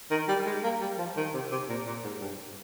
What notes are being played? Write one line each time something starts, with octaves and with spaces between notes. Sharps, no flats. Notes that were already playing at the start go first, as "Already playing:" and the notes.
D#3
G3
G#3
A#3
G3
F3
D#3
C3
C3
A#2
A#2
G#2
G2